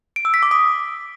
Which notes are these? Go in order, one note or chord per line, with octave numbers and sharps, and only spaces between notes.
D7
E6
B6
D6
D#6